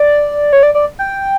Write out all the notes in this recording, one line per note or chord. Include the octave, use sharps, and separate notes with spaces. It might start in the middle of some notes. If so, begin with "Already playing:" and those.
Already playing: D5
C#5
D5
D5
G5